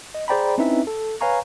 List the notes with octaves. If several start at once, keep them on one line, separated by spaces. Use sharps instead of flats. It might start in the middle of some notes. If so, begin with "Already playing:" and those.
D#5
G#4 C5 D5 G5 A#5 B5
C4 C#4 D#4 E4 B4 E5
A4
B4 C#5 F5 G#5 A#5 C#6